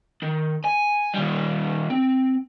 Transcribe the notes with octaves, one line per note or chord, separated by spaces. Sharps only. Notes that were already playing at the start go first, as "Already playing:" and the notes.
D#3
G#5
D#2 G3
C4